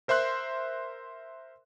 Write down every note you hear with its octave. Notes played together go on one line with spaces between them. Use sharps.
A#4 C5 E5 C6 F#6